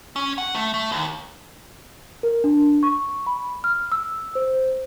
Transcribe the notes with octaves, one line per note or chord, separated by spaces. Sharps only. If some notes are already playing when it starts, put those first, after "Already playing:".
C#4
F#5
A3
A3
D#2
A#4
D4
C#6
B5
F6
E6
C5